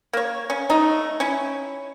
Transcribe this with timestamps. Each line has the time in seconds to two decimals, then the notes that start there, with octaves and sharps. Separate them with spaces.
0.13 A#3 C#5
0.50 C#4
0.69 A3 D#4
1.20 C#4 E4